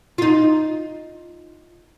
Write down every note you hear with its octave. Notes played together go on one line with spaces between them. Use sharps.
D#4 F4